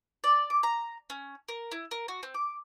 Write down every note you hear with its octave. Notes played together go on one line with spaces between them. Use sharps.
D5
D6
A#5
C#4
A#4
E4
A#4
F#4
C4
D6